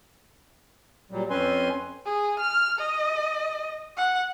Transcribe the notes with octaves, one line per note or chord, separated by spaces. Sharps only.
A#2 F#3 G3
F2 C4 C#4 B4 G#5 C6
G#4
F6
D#5
F#5